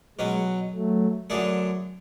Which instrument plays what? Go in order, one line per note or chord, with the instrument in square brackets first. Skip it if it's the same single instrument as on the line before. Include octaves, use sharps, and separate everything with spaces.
[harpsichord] B2 F#3 C#4 [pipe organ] G#3
[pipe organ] F#3 A3
[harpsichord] F#2 D3 A3 D4 G#4